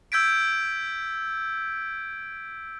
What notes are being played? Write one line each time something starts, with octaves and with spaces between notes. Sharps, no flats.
E6 G6 G#6 B6 D7